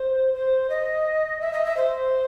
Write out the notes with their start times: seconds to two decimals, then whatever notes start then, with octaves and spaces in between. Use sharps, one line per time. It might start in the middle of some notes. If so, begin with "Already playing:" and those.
Already playing: C5
0.34 C5
0.70 D#5
1.41 E5
1.53 D#5
1.65 E5
1.77 C5